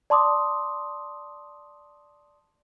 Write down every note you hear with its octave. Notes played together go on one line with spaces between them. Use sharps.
D5 A5 C6 D6 D#6